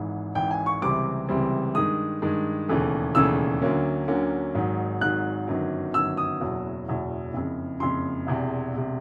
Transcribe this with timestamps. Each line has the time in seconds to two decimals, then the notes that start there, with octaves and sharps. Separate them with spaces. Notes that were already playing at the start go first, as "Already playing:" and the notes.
Already playing: G#1 G#2 E3
0.35 G#1 G#2 E3 G5
0.51 G#5
0.66 C#6
0.82 C#2 C3 E3 G3 C4 D6
1.29 C#2 C3 E3 G3 C4
1.75 G2 D#3 G#3 D#6
2.22 G2 D#3 G#3
2.68 E1 D#2 C#3 E3 A3
3.15 E1 D#2 C#3 E3 A3 E6
3.62 D2 D3 F#3 A#3 C#4
4.08 D2 D3 F#3 A#3 C#4
4.54 G#1 G#2 D#3 F#3
5.01 G#1 G#2 D#3 F#3 F#6
5.47 G1 F#2 D#3 F#3
5.94 G1 F#2 D#3 F#3 E6
6.17 D#6
6.41 F#1 E2 B2 F#3
6.88 F#1 E2 B2 F#3
7.34 F#1 F2 C#3
7.80 F#1 F2 C#3 C6
8.27 E1 E2 C3
8.74 E1 C3